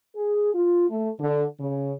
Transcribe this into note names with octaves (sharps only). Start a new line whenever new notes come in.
G#4
F4
A3
D3
C#3